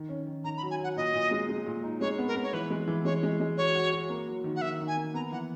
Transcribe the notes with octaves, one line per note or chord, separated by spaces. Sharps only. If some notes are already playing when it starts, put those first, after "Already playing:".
Already playing: D#3
C#4
D#3
D#3 A#5
B5
F#3
G#5
F#3 F#5
A#2 D#5
A#2
G#3
G#3
A#2
D#4
G#3 C#5
B3
A#4
B3
C#5
E3 B4
G#3
E3
G#3 C#5
G#3
G#3
F#4 C#5
F#4
F#4
A#3
F#3
D#3
F#5
D#3 E5
D#3
G#5
A#3
B3 A#5
E3 F#5